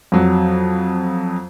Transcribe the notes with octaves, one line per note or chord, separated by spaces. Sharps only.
F2 F#3